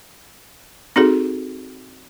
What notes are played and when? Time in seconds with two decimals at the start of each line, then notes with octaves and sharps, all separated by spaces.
0.96 C4 D#4 F#4 G#4 A4